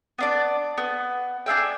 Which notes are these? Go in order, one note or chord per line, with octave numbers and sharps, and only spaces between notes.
B3 D4 D5
B3
D4 G#4 E5 G5